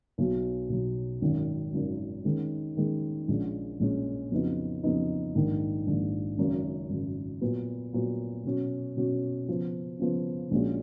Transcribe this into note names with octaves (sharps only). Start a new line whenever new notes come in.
B1 B2 F#3
B1 B2 F#3
G#1 F#2 D#3
G#1 F#2 D#3
D#3 G#3 C#4
D#3 G#3 C#4
A#1 A#2 G#3 C#4
A#1 A#2 G#3 C#4
F2 C#3 F#3 B3 D#4
F2 C#3 F#3 B3 D#4
A#1 G#2 D#3
A#1 G#2 D#3
G#1 F#2 C#3
G#1 F#2 C#3
A#2 F#3 B3
A#2 F#3 B3
B2 F#3 C#4 F#4
B2 F#3 C#4 F#4
C#3 F3 B3
C#3 F3 B3
A#1 A#2 G#3 C#4 F#4